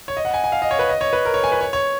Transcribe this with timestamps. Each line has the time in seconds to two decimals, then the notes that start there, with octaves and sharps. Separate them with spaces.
0.08 C#5
0.17 D#5
0.25 F#5
0.34 G#5
0.44 G#5
0.52 F5
0.62 D#5
0.71 C#5
0.79 B4
0.89 D#5
1.01 C#5
1.13 B4
1.25 A#4
1.34 C#5
1.44 G#5
1.52 B4
1.61 C#5
1.73 C#5